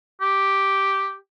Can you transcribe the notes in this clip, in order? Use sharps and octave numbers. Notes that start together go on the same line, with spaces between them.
G4